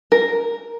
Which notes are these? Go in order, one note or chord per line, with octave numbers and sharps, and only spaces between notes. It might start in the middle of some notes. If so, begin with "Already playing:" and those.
A#4